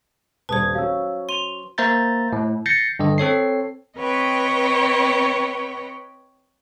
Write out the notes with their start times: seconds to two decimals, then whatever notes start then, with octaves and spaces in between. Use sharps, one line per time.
0.49 D#1 G2 B4 C5 A5 D#6 G#6
0.75 F#3 C#4 F5 E6
1.29 C6 D#7 F7
1.78 A#3 C5 E5 A#5 G6 A6
2.33 A2
2.66 G6 A6 A#6 C7 C#7
2.99 G2 D3 D#5
3.18 C4 A4 C#5 C7
3.98 C4 B4 C#5 D#5 G5